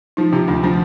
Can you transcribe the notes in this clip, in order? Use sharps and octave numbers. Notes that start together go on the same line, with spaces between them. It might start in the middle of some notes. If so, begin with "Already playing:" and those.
F3 D#4
C3 F4
D2 D4
F3 D4